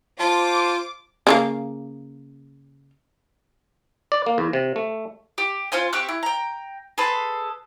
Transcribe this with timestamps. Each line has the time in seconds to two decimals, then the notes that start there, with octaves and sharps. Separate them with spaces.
0.20 F4 C5 A5 D6
1.27 C#3 F3 A#3
4.12 D5
4.26 A#3
4.38 E2
4.53 C3
4.76 A3
5.38 G4
5.72 C#4 F4 C5 G#5
5.93 C4 G4 C#6 F#6
6.08 E4
6.23 G5 A#5
6.98 G#4 A4 B4 C6